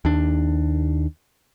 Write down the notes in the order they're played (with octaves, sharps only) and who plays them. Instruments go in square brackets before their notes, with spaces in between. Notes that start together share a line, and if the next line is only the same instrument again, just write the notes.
[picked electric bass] D#2 D4